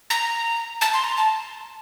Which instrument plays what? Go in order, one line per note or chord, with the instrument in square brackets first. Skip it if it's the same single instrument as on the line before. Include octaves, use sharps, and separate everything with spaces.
[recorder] A#5
A5
C6
A#5
A5